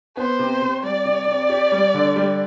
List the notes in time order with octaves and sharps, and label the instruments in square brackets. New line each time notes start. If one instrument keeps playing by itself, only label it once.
[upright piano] B3 [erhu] C5
[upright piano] C3
C3
[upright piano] G3 [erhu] D5
[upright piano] C3
C3
G4
G3
D3
G3